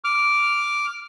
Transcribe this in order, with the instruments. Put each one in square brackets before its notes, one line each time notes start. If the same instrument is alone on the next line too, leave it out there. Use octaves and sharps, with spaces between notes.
[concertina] D6 F6